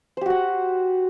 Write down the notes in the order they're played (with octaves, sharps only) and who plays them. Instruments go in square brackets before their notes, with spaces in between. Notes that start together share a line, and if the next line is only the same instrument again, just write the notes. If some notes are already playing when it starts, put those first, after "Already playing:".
[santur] C5
G4
F#4
F#5